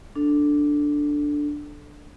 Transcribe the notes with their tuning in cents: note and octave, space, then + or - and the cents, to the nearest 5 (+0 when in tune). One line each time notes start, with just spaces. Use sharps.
D4 +0 A4 +0